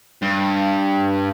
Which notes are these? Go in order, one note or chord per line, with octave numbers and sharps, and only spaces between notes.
G2